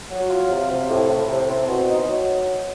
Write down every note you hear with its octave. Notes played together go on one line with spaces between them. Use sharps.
F#3
F4
C3
C3
A2
A2
C3
C4
B2
D#4
F#3